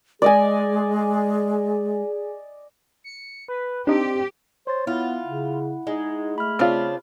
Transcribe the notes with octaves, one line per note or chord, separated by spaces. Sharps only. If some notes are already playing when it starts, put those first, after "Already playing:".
G#3 G#4 D5 D#5 G#5
C#7
B4
C4 D4 D#4 G4
C5 C#5 A6
B3 E4 F4 F#5
C#3
G#3 D#4
A3 B5 F6
C#3 C4 D4 F4